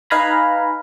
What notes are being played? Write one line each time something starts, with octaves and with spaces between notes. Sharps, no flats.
D#4 B4 F5 G#5 A#5 B5